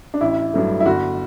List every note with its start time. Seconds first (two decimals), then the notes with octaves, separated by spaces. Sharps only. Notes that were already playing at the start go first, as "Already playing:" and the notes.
0.14 D4
0.21 A1 E4
0.54 G2 F#3 A3
0.80 E4
0.86 G1 F#4